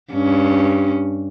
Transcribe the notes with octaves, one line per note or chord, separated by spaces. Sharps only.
G2 C#4